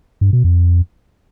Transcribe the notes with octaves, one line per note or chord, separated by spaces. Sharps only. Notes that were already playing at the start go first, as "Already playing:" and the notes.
G2
B2
F2